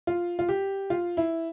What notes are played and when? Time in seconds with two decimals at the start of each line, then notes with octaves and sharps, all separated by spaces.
0.07 F4
0.39 F4
0.49 G4
0.90 F4
1.17 E4